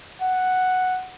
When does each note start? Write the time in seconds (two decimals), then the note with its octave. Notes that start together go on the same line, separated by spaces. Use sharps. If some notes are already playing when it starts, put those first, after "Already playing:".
0.22 F#5